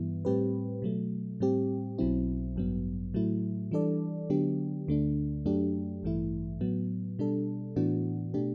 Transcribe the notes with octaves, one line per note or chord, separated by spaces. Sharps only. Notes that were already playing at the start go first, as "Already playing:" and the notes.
Already playing: G2 E3 G3 B3 E4
A2 G3 C4 G4 B4
B2 F#3 A3
A2 G3 C4 G4
B1 B2 F#3 C4 E4
A1 G2 F#3 B3
A2 F#3 A3 E4
E3 G3 D4 A4 D5
D3 F#3 B3 D4 G4
D2 D3 A3 D4
F#2 F#3 A3 D4 G4
A1 G2 E3 A3 E4
A2 F#3 B3
B2 G3 D4 A4
A2 E3 B3 D4 F#4
B2 A3 D4 G4